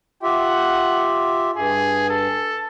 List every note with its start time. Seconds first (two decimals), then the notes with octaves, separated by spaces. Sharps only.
0.23 F4 G4 E5 F#5
1.56 G2 G#4
2.09 A4